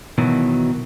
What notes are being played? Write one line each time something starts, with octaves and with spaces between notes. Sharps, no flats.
B2 D#3 E3 F#3